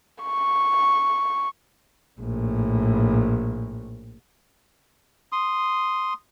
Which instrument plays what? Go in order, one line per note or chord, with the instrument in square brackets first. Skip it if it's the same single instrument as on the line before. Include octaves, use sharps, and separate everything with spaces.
[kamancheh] C#6
[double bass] A#1 A2
[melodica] C6 D#6